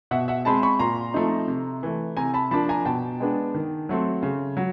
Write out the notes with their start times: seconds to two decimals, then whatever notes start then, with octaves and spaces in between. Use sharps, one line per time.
0.11 B2 E5 F#5
0.28 E5 F#5
0.45 G#3 C4 A5 B5
0.63 B5 C#6
0.79 A#2 A#5 C6
1.14 F3 A3 C4 D#4
1.48 C3
1.83 E3 A3
2.17 C3 G#5 A#5
2.34 A5 B5
2.51 F3 A#3 D4 A5 B5
2.69 G#5 A#5
2.85 B2 G5 A5
3.20 G#3 B3 D4
3.54 D#3
3.89 F#3 A3 C4
4.23 C#3
4.57 F#3